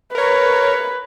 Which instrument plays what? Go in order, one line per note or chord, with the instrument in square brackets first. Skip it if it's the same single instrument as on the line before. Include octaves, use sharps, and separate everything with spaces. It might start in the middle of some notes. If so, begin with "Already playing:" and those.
[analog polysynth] A#4 C#5 [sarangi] B4